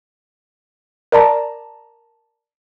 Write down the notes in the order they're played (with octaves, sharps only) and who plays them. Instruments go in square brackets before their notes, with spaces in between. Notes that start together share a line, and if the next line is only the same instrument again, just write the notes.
[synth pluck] A#4 D5 A5 A#5